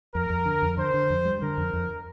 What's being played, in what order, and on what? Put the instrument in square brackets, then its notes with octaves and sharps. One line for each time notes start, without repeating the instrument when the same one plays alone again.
[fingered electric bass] F2 [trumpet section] A#4
[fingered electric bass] F2
D3
F2
[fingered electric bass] D3 [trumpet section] C5
[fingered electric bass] D3
F2
G3
[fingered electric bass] D3 [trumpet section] A#4
[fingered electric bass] F2
F2